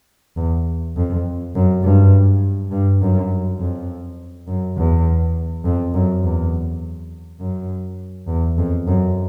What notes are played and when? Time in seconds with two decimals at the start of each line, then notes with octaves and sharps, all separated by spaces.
0.37 E2
0.97 F2
1.55 F#2
1.84 G2
2.71 G2
3.02 F#2
3.60 F2
4.48 F#2
4.77 E2
5.65 F2
5.94 F#2
6.24 E2
7.40 F#2
8.28 E2
8.58 F2
8.87 F#2